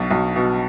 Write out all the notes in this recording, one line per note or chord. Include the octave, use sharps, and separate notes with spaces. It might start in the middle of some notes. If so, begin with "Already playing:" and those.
Already playing: B1 B2
B1
B2